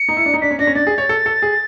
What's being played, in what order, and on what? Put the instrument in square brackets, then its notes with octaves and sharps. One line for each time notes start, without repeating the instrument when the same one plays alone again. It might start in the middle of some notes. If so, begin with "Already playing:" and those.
Already playing: [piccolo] C#7
[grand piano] D#4
E4
D4
D#4
[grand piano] D4 [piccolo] B6
[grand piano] C#4
[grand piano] D4 [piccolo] A#6
[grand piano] C#4
[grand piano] D4 [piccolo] A6
[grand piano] G#4
C#5
A4
A4
G#4